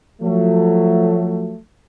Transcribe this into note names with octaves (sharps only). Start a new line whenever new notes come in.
F3 F#3 A3